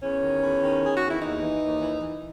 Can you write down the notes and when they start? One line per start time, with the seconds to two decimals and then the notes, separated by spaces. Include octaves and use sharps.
0.01 E2 C#4
0.21 D#3
0.41 E2
0.61 D#3
0.82 D#3 G#4
0.97 E2 F#4
1.09 E4
1.21 D#2 D#4
1.41 E3
1.62 D#2
1.81 E3
2.01 E3